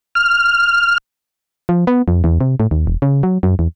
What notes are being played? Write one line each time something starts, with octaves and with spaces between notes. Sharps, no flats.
F6
F3
B3
F2
E2
C3
A2
D#2
E1
C#3
F#3
F#2
E2